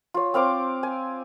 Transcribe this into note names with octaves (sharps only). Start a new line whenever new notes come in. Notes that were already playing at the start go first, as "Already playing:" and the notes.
F4 C#5
C4 F5 C6 D6
G#5